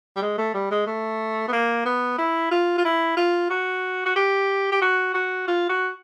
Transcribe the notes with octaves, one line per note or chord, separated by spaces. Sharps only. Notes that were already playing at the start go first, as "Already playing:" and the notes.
G3
G#3
A3
G3
G#3
A3
B3
A#3
B3
E4
F4
F4
E4
F4
F#4
F#4
G4
G4
F#4
F#4
F4
F#4